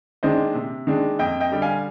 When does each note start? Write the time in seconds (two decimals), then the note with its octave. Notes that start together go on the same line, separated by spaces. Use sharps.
0.23 D#3 G#3 D4 C5 D#5
0.54 C3
0.87 D#3 G#3 D4
1.19 F2 D#5 G5
1.40 D#5 G5
1.51 D3 G3
1.62 F5 G#5